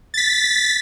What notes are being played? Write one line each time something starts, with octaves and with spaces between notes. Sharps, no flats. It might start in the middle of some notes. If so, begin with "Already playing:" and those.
A6 B6